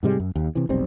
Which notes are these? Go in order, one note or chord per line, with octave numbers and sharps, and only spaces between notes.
G#2 C3 G3 G#3
F#2
D#2
C3 E3
F1 B1 G3 C4